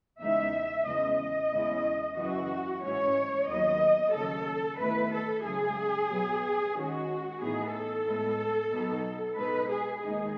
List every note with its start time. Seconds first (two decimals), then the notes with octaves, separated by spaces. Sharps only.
0.21 E2 C#3 G#3 D#4 E5
0.87 E2 C#3 G#3 D#5
1.19 D#5
1.52 E2 C#3 G#3 C#4 E4
2.17 F#2 C#3 E3 F#4
2.82 G#2 E3 G#3 C#4 C#5
3.48 D#2 D#3 F#3 B3 D#5
4.13 D#2 C#3 F#3 A4
4.79 E2 D#3 A3 E4 B4
5.12 A4
5.44 F#2 C#3 G#3 G#4
6.10 B2 F#3 B3
6.75 D#3 G#3 C#4 F#4
7.41 A2 E3 B3 D#4 G#4
7.73 A4
8.07 A2 G#3 B3
8.71 B2 F#3 B3 D#4
9.37 B2 G#3 D#4 B4
9.70 G#4
10.02 D#2 D#3 G#3 D#4 G#4